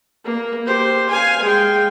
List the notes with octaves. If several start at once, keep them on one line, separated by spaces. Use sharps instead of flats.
A#3
G4 C5
F5 G#5
G#3 G5